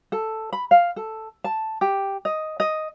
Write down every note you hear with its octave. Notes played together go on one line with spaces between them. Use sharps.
A4
B5
F5
A4
A5
G4
D#5
D#5